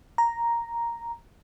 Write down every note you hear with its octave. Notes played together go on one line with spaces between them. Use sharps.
A#5